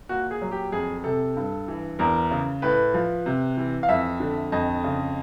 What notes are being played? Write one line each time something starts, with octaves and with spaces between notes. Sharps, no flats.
A#2 F#4
G#4
F#3
G4
F2 G#4
C3 A4
G2
E3
E2 A#4
C#3
A2 B4
F3
C3
E3
F5
F2 E5
D3
F2 D#5
C#3